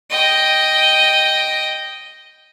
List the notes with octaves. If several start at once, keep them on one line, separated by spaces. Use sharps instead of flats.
D#5 G5